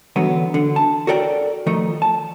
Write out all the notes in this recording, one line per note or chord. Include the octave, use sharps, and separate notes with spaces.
D3 E3 F#3 B3
D3
A5
F#4 A4 A#4 D5 G5
D#3 F3 A3 D#4
A5